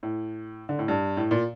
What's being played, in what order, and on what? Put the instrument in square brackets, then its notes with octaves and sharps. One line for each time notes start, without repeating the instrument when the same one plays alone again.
[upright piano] A2
D3
A2
G2
A2
A#2